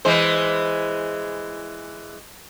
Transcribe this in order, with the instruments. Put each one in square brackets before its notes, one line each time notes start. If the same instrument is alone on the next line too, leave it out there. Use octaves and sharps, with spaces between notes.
[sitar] E3 G#3 C5